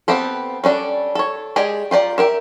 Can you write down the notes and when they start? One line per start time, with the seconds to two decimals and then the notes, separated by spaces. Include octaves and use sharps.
0.08 B3 C4 G4 A4
0.64 G3 C#4 D4 A4
1.15 A4 C#5
1.56 G#3 G4 G#4 D5 D#5
1.91 F4 G4 D5 A#5
2.18 G4 A#4 E5